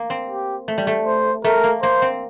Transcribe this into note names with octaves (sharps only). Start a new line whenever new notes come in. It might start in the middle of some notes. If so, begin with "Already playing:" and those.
Already playing: A#3
C4
G4
A3
G3
A3
C5
A3 A#4
A#3
A#3 C5
C4